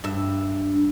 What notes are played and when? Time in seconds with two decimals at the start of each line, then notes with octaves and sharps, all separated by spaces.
0.04 G2 E5